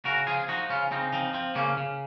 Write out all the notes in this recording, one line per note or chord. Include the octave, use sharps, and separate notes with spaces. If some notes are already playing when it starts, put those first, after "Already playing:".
C#3 F#4 A#4
F3 F4 G#4
F3 D#4 F#4
C#3 C#4 F4
C#3 C4 D#4
F3 C4 D#4
F3 C4
C#3 A#3 C#4
C#3